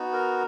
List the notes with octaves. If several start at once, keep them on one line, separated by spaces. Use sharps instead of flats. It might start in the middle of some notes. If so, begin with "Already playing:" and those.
Already playing: B3 D#4 F#4
A#4